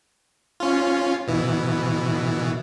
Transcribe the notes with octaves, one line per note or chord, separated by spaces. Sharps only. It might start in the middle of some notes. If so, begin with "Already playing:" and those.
C#4 F4
B2 E3